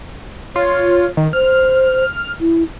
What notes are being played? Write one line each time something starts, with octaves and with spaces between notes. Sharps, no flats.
F4 C#5
D#3
C5 F6
E4